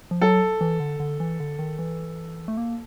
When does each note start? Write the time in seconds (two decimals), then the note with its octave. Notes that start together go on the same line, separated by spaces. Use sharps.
0.11 F3
0.21 F#3 A4
0.61 E3
0.80 D3
1.00 D3
1.20 E3
1.40 D3
1.59 D#3
1.79 E3
2.48 A3
2.57 A#3